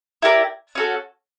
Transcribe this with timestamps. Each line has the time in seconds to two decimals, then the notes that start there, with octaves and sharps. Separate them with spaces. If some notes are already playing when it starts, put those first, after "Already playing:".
0.22 E4 G4 A#4 D5
0.75 C#4 F#4 A4